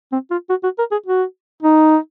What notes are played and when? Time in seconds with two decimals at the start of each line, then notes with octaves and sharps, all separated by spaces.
0.12 C4
0.31 F4
0.50 F#4
0.63 F#4
0.79 A#4
0.92 G#4
1.06 F#4
1.63 D#4